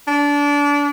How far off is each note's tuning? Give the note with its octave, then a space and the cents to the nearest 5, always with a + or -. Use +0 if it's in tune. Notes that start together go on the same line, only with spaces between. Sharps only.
D4 -25